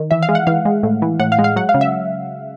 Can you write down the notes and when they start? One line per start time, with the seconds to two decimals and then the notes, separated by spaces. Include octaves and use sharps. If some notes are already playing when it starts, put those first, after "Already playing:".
Already playing: D#3
0.11 E3 E5
0.22 F5
0.29 G#3
0.35 F#5
0.47 E3 F5
0.65 G#3
0.83 A2
1.02 E3
1.19 A2 F#5
1.32 F5
1.39 G#3
1.44 F5
1.56 F#3 F#5
1.69 F5
1.74 C#3
1.81 E5